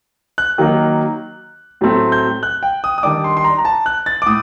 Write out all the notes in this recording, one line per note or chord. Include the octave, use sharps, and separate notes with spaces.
F#6
D#3 F#3 A#3 D#4
A2 F#3 A3 C4
G6
F#6
G5
D#6
D#6
D#3 G3 D4 D6
C6
C6
A#5
A#5
A5
F#6
A6
D6
A2 D#6